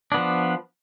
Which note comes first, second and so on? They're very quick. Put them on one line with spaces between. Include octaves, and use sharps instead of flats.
D4 B3 F3